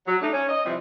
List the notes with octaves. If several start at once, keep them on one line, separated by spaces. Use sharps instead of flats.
F#3
G3 A3 D4 D#4
C#4
D#5
C3 E3 F3 G3